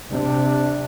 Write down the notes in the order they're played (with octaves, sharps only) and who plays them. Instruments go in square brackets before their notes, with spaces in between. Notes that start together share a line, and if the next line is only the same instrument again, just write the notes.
[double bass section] C3 [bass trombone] D4